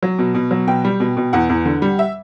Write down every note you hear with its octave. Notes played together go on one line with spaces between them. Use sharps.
F#3
B2
B2
F#3
B2 G5
G3
B2
B2
E2 F#5
E2
D3
G3
E5